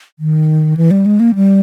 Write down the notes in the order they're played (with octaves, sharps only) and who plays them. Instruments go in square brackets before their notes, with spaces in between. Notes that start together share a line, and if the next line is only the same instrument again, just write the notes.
[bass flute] D#3
E3
G3
G#3
A#3
G3